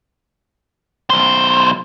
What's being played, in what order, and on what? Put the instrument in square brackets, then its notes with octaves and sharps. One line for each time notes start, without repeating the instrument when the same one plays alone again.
[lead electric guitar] B1 C5